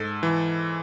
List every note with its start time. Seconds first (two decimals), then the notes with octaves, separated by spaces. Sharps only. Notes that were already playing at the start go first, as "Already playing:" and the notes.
Already playing: G#2 A4
0.23 E3